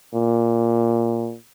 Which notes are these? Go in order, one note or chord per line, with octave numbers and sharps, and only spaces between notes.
A#2